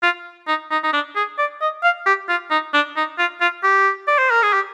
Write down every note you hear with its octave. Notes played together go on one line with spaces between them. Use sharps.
F4
D#4
D#4
D#4
D4
G#4
D5
D#5
F5
G4
F4
D#4
D4
D#4
F4
F4
G4
D5
C5
A#4
G#4
G4